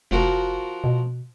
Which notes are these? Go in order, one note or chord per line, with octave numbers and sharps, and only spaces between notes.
F1 F3 F#4 A#4
B2